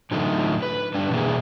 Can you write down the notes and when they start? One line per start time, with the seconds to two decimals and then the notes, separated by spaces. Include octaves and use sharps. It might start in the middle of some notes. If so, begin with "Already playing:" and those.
0.11 A2 D3 F#3 A3 D#4 F4
0.62 B4
0.94 D3 G3 D4
1.10 B2 E3 A#3 G#4